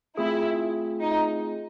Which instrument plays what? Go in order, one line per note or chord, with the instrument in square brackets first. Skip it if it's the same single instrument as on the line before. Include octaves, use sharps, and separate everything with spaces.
[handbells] A3 C4 F4 G#4 [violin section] E4
[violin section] D#4